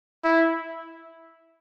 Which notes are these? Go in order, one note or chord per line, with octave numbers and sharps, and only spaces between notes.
E4